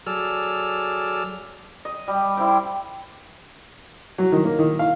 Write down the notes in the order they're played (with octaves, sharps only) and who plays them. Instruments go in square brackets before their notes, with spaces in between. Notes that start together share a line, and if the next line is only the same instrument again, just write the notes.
[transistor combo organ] F#3 G#4 A4 D5 E6 F6
[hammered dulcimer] D#5
G3
E4 C5 G5
[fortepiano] F#3
D#3
A#3
D#3
F5